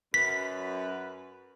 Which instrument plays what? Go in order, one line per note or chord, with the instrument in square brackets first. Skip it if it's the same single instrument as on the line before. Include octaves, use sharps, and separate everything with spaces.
[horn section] F#2 B4 [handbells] B6